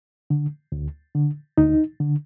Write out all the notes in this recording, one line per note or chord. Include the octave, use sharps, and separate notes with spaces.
D3
D2
D3
D2 D#4
D3